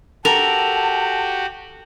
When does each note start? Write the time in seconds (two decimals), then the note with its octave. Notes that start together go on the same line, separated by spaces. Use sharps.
0.25 F#4 G4 A4 A#4 A5 F7